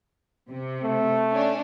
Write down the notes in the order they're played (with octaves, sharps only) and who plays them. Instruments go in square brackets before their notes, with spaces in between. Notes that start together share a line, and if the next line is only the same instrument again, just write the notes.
[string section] C3
[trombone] A3
[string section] C#4 D4